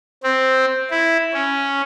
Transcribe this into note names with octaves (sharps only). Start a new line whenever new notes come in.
C4
E4
C#4